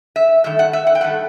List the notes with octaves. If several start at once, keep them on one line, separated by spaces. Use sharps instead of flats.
E5
G2 D#3 A3 E5
F#5
E5
F#5
G5
G2 D#3 A3 F#5